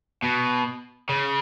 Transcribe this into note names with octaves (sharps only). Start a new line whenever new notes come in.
B2
C#3